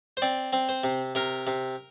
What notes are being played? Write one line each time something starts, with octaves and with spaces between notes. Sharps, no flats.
C5
C4 D5
C4
C5
C3
C3 A#4
C3